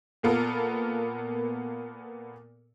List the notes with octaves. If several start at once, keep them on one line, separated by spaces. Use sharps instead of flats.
A#2 A#3 B3 F4 A4 A#4